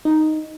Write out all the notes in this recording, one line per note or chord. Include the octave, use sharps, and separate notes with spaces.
D#4